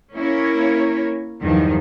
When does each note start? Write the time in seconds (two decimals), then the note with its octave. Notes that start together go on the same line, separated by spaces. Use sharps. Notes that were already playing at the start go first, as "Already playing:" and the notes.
0.14 A#3 C#4 E4 A#4 C#5
1.41 E2 G2 D#3 F3 F#3